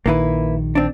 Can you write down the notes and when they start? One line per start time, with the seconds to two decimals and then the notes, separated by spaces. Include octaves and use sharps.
0.06 A#1 D#3 A#3 E4 B4
0.75 C4 D4